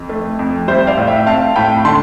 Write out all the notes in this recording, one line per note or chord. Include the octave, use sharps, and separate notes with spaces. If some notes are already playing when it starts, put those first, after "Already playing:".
Already playing: F2
A3
F2
G3 C5 E5
D5 F5
A2
E5 G5
C4 F5 A5
A2 G5 B5
D3 A5 C6